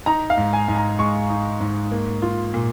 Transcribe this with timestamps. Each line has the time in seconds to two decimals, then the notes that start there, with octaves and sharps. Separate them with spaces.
0.06 D#4 A#5
0.30 F5
0.37 G#2
0.53 G#5
0.68 G#2
0.76 A#5
0.99 G#3 C#6
1.29 D#4
1.60 G#2
1.92 A#3
2.22 F4
2.54 A#2